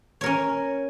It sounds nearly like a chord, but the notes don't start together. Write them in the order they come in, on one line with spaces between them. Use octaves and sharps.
C#5 A#4 C#4